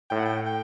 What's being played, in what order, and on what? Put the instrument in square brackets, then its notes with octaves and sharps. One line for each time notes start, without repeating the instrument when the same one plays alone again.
[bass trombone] A2 [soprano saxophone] G5
[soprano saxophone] F#5
G5
G5